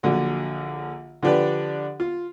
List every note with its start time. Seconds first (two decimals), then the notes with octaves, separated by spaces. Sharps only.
0.03 A#1 D3 F#3
1.23 D3 F3 D4 G4 B4
2.00 F4